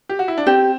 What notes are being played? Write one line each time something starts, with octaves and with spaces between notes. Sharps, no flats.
G4
F#4
E4
D4
C4 G4